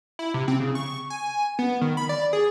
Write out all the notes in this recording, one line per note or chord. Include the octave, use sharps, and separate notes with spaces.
E4
C3
C4
C#3
C#6
G#5
B3
D#3
B5
D5
G#4